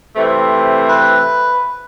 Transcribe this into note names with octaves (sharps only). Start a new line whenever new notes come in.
C3 E3 A3 C4
B4